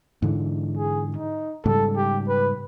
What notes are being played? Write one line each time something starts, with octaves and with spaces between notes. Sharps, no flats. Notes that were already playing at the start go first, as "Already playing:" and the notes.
G#2 D3 E3
G#4
D#4
G#2 C#3 G3 A4
G4
B4